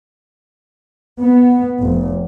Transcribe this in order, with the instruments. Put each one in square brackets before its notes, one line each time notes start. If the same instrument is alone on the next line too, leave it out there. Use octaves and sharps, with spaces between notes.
[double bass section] B3
F1